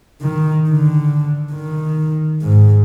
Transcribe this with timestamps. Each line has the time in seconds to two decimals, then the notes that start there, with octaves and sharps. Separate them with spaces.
0.21 D#3
0.69 D3
1.53 D#3
2.42 G#2